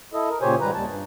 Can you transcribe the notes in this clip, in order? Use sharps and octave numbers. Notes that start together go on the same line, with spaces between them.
E4 A4 D#5
A#4
A#2 C#3 G4 C5 C#5 G#5
G#2 D#3 G3 B4 A#5
D#2 G3 A5
G2